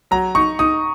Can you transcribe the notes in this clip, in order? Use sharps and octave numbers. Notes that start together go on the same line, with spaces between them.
F#3 A#5
D#4 C#6
D#4 D#6